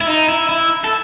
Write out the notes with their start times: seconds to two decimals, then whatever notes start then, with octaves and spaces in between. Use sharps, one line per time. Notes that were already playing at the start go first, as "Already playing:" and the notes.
0.01 E4
0.06 D#4
0.29 E4
0.49 E4
0.84 A4